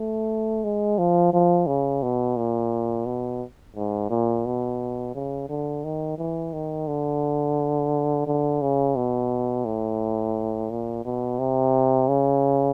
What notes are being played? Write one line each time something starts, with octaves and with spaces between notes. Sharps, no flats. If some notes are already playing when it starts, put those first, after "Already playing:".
Already playing: A3
G#3
F3
F3
C#3
B2
A#2
B2
G#2
A#2
B2
C#3
D3
D#3
E3
D#3
D3
D3
C#3
B2
A2
A#2
B2
C3
C#3